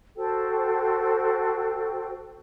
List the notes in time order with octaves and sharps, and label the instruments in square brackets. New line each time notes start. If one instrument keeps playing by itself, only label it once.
[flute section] F#4 A4 C5 G5